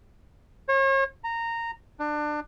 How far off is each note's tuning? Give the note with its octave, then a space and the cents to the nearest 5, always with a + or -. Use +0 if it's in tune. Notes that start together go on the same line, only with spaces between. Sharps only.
C#5 -40
A#5 -15
D4 +25